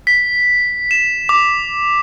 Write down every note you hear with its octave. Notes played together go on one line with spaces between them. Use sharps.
B6
E7
D6